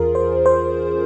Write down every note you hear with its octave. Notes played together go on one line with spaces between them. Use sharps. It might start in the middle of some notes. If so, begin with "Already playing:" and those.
Already playing: E2 E3 C#4 F4 G#4 A#4
C5
C5